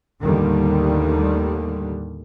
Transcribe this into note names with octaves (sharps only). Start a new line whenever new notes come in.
D#2 A2 D3 D#3 G3